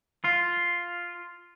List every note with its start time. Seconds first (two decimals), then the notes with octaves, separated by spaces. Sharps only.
0.24 F4